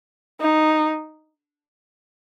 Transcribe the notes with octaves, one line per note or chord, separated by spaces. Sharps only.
D#4